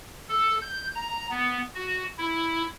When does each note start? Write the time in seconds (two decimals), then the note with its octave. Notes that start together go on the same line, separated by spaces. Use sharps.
0.29 A4
0.61 G6
0.95 A#5
1.30 B3
1.75 F#4
2.18 E4